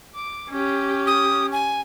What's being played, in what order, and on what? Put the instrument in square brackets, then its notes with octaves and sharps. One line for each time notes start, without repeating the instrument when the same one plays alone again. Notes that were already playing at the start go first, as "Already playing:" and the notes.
[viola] D6
C#4 G4
[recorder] D#6
G#5